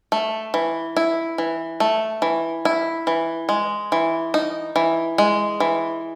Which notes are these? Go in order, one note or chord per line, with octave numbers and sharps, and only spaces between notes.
A3
E3
E4
E3
A3
E3
E4
E3
G#3
E3
D#4
E3
G#3
E3